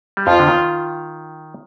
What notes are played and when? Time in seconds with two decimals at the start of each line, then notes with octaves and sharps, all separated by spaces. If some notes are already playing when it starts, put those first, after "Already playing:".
0.17 G3
0.27 F2 F3 F4
0.39 D3
0.47 D#3